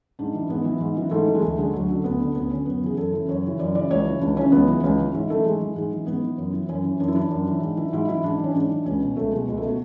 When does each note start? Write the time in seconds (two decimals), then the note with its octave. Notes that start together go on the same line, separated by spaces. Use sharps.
0.19 G#2 D4
0.34 E3
0.49 G#2 B3
0.64 E3
0.80 G#2
0.97 E3
1.11 G#2 A3
1.27 E3
1.35 G#3
1.42 D2 A3
1.58 D3 G#3
1.73 D2 F#3
1.89 D3
2.04 D2 B3
2.20 D3
2.35 D2 B3
2.51 D3 C#4
2.66 F#2 B3
2.82 C#3 E3 G#4
2.97 F#2 A4
3.12 C#3 E3
3.28 F#2 C#5
3.43 C#3 E3
3.59 F#2 D5
3.75 C#3 E3 D5
3.91 C#2 C#5
4.05 C#3 E3
4.21 C#2 D4
4.37 C#3 E3 C#4
4.52 C#2 B3
4.67 C#3 E3
4.83 C#2 C#4
4.99 C#3 E3
5.14 G#2 E4
5.30 E3 A3
5.45 G#2 G#3
5.60 E3
5.76 G#2 G#3
5.92 E3
6.06 G#2 B3
6.23 E3
6.38 F#2
6.53 E3
6.68 F#2 C#4
6.84 E3
7.00 F#2 D4
7.08 E4
7.15 E3 D4
7.31 F#2
7.47 E3
7.61 G#2
7.77 E3
7.93 G#2 E4
8.09 E3 E4
8.23 G#2 D4
8.39 E3 C#4
8.55 G#2 D4
8.70 E3
8.86 C#2 C#4
9.01 B2
9.17 C#2 A3
9.32 B2 G#3
9.48 C#2 G#3
9.57 A3
9.63 B2
9.69 F#4